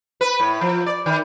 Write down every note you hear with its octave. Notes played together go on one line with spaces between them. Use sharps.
B4
A2
F3
D5
D#3